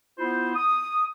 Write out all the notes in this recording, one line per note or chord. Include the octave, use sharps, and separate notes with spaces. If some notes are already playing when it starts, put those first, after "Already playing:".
B3 E4 F4 C5
D#6